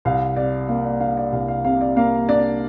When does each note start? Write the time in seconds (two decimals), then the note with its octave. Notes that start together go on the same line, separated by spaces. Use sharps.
0.05 C2 F5
0.36 C3 D5
0.68 A#3 F5
0.85 D5
1.00 D4 F5
1.17 D5
1.32 C2 F5
1.48 F5
1.64 C3 F5
1.81 D5
1.96 A#3 F5
2.28 D4 D5